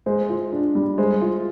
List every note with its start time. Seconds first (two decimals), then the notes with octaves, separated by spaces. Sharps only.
0.06 G#3 C5
0.29 F4
0.52 D4
0.75 G3
0.98 G#3 C5
1.22 F4